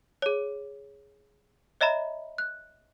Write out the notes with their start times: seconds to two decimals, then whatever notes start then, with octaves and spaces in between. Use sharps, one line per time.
0.22 G#4 C#5
1.81 C#5 D#5 E5 A#5 B5
2.38 F#6